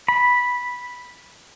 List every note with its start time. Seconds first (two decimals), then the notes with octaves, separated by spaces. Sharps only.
0.08 B5